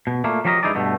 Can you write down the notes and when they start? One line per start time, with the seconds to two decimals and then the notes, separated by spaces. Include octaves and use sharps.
0.07 B2
0.24 A#2 A3 A#3
0.45 F3 F#3 G4 A#4 C#5 D#5
0.63 G2 G#3 D#4 E4 G#4 D5
0.75 G2 B2 A3